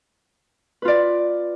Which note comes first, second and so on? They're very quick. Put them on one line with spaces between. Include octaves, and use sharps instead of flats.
B4 F4 D5